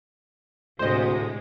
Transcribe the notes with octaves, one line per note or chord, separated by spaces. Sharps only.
D2 A2 C3 G#3 C5 D#5